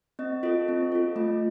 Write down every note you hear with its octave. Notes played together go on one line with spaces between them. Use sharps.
C4 D#5
F4 A4 D#5
C4
F4 A4
A3 D#5